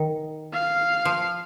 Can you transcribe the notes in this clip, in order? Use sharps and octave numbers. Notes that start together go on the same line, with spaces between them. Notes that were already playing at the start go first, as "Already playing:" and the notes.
Already playing: D#3
F5
F3